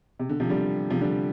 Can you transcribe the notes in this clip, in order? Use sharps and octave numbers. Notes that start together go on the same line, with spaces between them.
C3
D3
C3 F3
D3 G3
C3 F3
D3 G3